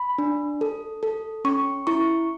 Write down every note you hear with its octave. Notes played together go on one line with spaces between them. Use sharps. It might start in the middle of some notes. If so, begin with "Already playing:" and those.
Already playing: B5
D4
A4
A4
C#4 C#6
E4 C#6